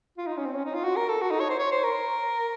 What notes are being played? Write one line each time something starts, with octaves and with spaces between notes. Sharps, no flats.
F4
D#4
C#4
C4
C#4
D#4
F4
F#4
A#4
A4
F#4
D#4
C#5
C5
C#5
C5
A#4